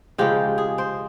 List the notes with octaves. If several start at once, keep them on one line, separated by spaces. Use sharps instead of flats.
C#3 F3 G#3 G4
G#4
C5